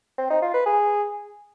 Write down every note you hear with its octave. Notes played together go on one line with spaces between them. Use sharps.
C4
D#4
F4
B4
G#4